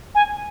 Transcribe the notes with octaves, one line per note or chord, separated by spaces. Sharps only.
G#5